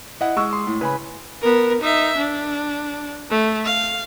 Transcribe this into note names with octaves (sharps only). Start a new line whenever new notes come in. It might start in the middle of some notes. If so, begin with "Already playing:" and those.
E4 D#5 F#5
G#3 C#6 E6
C6 D#6
A2
C#3 B4 G#5 B5
B3 A#4
D#4 E5
D4
A3
F5